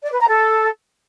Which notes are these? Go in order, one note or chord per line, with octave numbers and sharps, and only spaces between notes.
D5
B4
A#5
A4